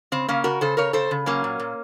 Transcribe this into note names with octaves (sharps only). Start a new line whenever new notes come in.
C#3 C4
C#3 A#3 C#4
C#3 F#4 A#4
C#3 A4 C5
C#3 A#4 C#5
C#3 A4 C5
C#3
F#3 A#3 C#4
A#2
A#2